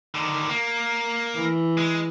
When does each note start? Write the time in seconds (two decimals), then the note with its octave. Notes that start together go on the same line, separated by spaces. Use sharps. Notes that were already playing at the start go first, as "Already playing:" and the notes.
0.15 D3 D#3
0.49 A#3
1.35 E3
1.77 G#3